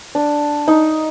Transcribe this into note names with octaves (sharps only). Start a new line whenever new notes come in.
D4
D#4